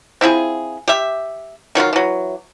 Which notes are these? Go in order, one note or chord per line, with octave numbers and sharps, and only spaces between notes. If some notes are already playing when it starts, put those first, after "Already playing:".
C4 E4 F4 G#4
G4 E5
D#3 F#3 E4 F4
E3 F#3